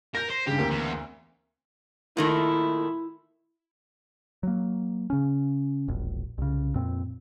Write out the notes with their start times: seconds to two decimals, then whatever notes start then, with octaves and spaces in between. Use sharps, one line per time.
0.15 A#4 G6 A#6
0.30 C5
0.47 G2 C#3 G4
0.58 D2 A#3 C4
0.71 E2
2.17 A#2 D#3 A3 E4
4.43 F#3 A#3
5.10 C#3 C#4
5.88 E1 A#1
6.38 C2 C#3
6.75 F2 A#2 C4